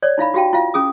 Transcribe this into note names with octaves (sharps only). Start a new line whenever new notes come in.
C#5 D5
D#4 E4 F5 B5
F#4 G4 F5 G5 A5
E4 F4 F5
C#4 G#4 D#6